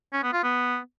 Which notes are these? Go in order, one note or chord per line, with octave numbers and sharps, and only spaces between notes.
C#4
B3
F4
B3